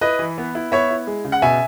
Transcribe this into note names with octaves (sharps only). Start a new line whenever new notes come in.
E4 B4 D#5
E3
B3
E4
B3 C#5 E5
E4
G#3
C#3
F#5
B2 E5 G#5